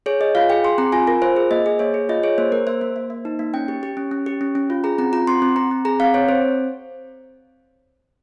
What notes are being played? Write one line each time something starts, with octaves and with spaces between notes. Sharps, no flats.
G#4 C#5
G#4 D#5
F4 F5
G#4 G5
G#4 C6
C4 A#5
F4 G#5
F4 A#4
F4 C5
G#4
A#3 D#5
G#4
A#3 C#5
G#4
F4 D#5
G#4 C#5
A#3 C5
A#3 A#4
A#3 C5
A#3
A#3
A#3
D#4
A#3
C#4 G5
G4
G4
C#4
C#4
G4
C#4
C#4
F4
G#4 A#5
C4 A#5
F4 A#5
C4 C6
C4
C4 A#5
C4
G#4 A#5
C4 F5
C4 C#5
C4 C5